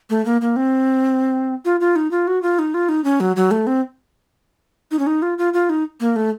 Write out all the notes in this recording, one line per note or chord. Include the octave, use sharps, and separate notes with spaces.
A3
A#3
A#3
C4
F4
F4
D#4
F4
F#4
F4
D#4
F4
D#4
C#4
F#3
F#3
A3
C4
D#4
C#4
D#4
F4
F4
F4
D#4
A#3
A3